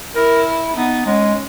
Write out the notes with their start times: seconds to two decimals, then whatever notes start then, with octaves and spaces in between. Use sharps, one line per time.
0.15 E4 A#4
0.76 B3 D#4
1.06 G#3 C#4